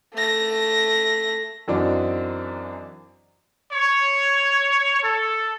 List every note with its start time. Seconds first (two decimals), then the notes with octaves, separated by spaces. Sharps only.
0.14 A3 A#6
1.68 F#2 E3 C4 D4 D#4 F#4
3.73 C#5
5.03 A4